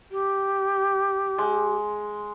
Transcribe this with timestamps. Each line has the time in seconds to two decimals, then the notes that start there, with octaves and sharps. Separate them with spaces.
0.11 G4
1.38 G#3